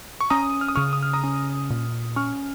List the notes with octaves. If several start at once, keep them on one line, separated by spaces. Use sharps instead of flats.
C#6
C#4 A#5 D#6
F6
D#6
C#3 C#6 F6
D#6
F6
A#5 D#6
C#4
A#2
C#4 C#6 F6